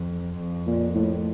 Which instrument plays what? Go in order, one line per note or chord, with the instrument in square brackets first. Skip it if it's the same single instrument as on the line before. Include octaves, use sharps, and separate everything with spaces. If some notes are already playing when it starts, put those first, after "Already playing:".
Already playing: [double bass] F2
F2
[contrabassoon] A#2
A2